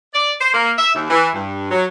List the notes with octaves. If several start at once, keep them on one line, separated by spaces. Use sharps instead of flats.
D5
C5
A#3
E5
D#2
E3
G2
F#3